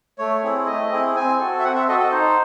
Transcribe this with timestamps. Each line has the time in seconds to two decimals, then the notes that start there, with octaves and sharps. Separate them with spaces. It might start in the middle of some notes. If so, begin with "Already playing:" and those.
0.18 A3 C#5
0.44 C4 E4 G#4
0.67 A3 D#5
0.91 C4 E4 G#4
1.15 C4 G#5
1.39 F#4 A4
1.59 E5
1.64 C4 F#5
1.75 E5
1.88 F#4 A4 D#5
2.00 D#5
2.12 D#4 C5